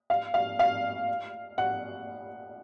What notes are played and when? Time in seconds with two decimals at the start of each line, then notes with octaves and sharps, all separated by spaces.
0.10 F5
0.34 F5
0.59 F5
1.58 F#5